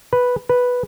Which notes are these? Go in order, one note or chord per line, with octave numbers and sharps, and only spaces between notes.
B4
B4